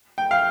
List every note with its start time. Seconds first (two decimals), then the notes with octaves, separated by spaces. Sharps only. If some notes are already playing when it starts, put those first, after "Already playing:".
0.18 G5
0.31 F5